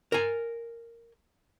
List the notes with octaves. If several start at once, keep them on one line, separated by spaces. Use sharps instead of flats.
A#4 G#5